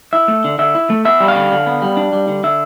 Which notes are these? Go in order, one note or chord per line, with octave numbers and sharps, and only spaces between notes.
E4 E5
A3
D3
D3 E5
E4
A3
B3 E5
G3
F5
D3
D3
B3
G3
D4
G3
D3
D3 E5